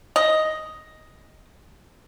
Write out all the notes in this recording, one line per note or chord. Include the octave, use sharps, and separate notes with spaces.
D#5